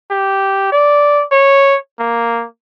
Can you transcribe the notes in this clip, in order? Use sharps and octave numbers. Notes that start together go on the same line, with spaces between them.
G4
D5
C#5
A#3